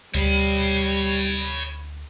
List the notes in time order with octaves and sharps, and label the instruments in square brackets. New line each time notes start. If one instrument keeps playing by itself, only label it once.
[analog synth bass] D2 [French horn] G3 [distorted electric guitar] C#5 B5